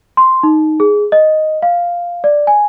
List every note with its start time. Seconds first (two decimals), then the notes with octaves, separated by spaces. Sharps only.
0.17 C6
0.43 D#4
0.80 G#4
1.12 D#5
1.62 F5
2.24 D5
2.47 G#5